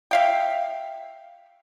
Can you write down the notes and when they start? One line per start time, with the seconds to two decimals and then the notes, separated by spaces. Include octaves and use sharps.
0.11 E5 F5 G5